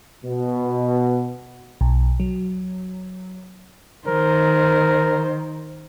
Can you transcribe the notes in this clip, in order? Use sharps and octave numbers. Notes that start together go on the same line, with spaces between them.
B2
B1
F#3
D#3 A#4 C5